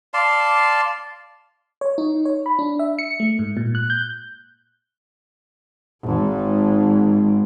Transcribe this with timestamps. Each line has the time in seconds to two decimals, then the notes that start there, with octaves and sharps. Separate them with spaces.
0.14 D5 F5 A5 C6
1.81 C#5
1.98 D#4
2.25 C#5
2.46 B5
2.59 D4
2.79 E5
2.99 C#7
3.20 A3
3.39 G#2
3.57 A#2
3.75 F#6
3.90 G6
6.03 G#1 G#2